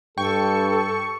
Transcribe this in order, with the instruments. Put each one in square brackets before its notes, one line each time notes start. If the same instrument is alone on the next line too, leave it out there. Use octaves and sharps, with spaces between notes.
[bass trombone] G2 [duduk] A4 [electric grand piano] G5 [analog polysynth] C#6